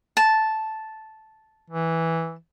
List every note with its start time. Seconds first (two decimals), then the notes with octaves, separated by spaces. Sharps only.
0.17 A5
1.70 E3